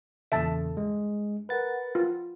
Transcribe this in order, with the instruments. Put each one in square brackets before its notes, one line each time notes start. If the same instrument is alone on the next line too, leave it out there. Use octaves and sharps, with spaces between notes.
[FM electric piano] E2 A#2 C#3 [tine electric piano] A4 [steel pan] E5 A5
[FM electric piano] G2 [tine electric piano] G#3
[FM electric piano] A#4 F#5 B5 [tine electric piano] B4 A6
[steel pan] F4